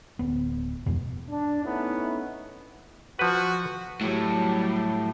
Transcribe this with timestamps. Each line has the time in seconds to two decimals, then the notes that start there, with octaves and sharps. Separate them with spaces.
0.19 D1 B3
0.86 E2 G2 B2
1.29 D4
1.64 A3 B3 C#4 D#4 E4
3.19 F3 F#4 B4
4.01 A2 F#3 G3